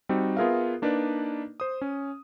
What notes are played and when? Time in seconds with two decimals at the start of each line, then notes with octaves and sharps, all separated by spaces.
0.09 G3 C4 D#4 F#4
0.37 B3 F4 G#4 A#4 E5 F5
0.82 A#3 D4 D#4 B4 D5
1.60 C5 D#6
1.81 C#4